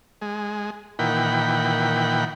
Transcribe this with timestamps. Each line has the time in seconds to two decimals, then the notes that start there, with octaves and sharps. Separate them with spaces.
0.22 G#3
0.99 A#2 D#3 E3 F#5 G5 B5